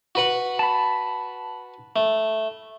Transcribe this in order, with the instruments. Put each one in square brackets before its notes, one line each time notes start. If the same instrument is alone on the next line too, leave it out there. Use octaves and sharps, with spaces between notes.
[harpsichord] F#4 B4 F#5
[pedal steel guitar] A5 B5
[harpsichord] A3